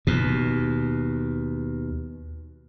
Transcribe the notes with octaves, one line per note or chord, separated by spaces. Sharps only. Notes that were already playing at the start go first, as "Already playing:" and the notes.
D#2 B2